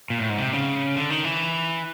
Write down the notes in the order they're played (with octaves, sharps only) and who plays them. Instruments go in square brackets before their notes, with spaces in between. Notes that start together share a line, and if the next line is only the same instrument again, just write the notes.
[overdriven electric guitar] A#2
A2
G#2
C3
C#3
D3
D#3
E3